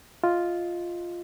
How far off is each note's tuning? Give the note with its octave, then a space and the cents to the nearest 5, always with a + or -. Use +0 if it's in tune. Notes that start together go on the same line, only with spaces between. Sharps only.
F4 +0 D#5 +10